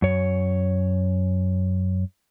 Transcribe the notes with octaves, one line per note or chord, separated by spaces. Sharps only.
F#2 C#5